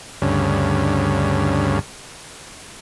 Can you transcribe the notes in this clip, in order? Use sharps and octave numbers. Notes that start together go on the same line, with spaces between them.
D2 G2 C#3